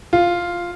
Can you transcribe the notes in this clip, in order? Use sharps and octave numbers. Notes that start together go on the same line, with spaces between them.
F4